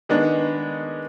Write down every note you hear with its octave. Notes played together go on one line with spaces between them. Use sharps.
D#3 G#3 B3 D4